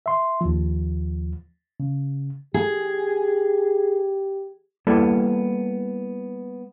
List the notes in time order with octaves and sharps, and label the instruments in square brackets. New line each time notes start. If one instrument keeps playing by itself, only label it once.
[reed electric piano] E5 C6
D#2 F3
C#3
[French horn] G4 [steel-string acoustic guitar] G#4
[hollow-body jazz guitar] G3 A#3 B3 E4 A4